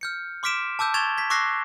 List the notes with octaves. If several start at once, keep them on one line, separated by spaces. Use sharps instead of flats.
F6 G6 C#7
C6 D6 F6 B6 D7 E7
A5 D6 E6 G6
C#6 G#6 A6 E7 F7 G7
G#6 B6
C#6 D6 E6 F#6 A#6 C7